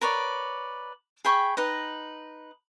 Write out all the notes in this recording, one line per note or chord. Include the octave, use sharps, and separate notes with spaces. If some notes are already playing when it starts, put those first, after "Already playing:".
A#4 B4 C#5 D5
G#4 G5 B5 C#6
D#4 B4 D#5